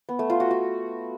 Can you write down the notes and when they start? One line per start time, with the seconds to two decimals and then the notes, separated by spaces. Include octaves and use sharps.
0.09 B3
0.19 A3
0.30 F4
0.40 F#4
0.51 F#4